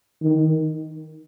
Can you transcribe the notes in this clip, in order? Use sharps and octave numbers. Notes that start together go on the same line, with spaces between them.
D#3